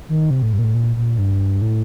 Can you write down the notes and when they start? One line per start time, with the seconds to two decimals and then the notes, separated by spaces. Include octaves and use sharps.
0.09 D#3
0.30 C3
0.42 A2
0.53 G2
0.59 A#2
0.64 A2
0.74 A#2
0.96 A#2
1.18 G2
1.62 A2